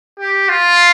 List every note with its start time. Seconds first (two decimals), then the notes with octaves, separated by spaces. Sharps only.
0.20 G4
0.49 F4